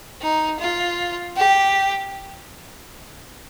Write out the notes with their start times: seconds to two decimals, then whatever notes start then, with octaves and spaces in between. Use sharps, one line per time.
0.22 D#4
0.60 F4
1.37 G4